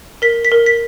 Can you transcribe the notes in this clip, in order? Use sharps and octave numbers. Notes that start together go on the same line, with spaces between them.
A#4 B6
B6
A#4
B6